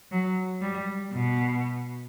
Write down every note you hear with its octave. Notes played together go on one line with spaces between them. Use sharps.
F#3
G3
B2